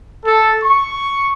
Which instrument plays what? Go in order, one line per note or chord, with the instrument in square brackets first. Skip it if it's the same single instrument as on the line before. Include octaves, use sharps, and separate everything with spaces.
[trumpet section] A4
C#6